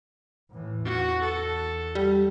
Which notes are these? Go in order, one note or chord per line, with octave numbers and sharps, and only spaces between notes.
A2 E3
E2 F#4
A4
G3